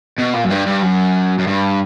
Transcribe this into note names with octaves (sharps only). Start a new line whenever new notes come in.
B2
A#2
F#2
G2
G2
F#2
F#2
G2